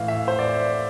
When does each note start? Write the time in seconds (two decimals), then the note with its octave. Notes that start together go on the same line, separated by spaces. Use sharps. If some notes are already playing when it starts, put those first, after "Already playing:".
Already playing: A2 E3 F5
0.08 E5
0.28 C5
0.39 D5